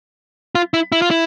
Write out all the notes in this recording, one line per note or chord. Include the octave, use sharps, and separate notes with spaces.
F4
E4
E4
F4
E4